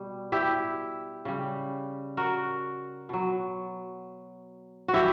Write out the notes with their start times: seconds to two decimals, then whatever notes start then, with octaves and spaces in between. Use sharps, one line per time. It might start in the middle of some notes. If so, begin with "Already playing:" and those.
Already playing: B2 G3
0.32 E4 G4
1.25 C#3 G3
2.17 F#4 A#4
3.09 B2 F#3
4.88 F#4
4.94 E3 G3 E4 G4